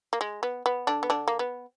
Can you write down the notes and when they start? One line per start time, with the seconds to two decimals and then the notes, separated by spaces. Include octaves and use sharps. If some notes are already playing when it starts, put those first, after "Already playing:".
0.13 A#3
0.21 G#3
0.43 B3
0.66 B3
0.87 D3 D4
1.03 B3
1.10 D3 D4
1.28 A#3
1.39 B3